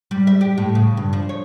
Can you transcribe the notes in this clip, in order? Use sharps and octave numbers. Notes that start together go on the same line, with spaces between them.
G3
E5
G4
A2
C#3
G2
F3
C#5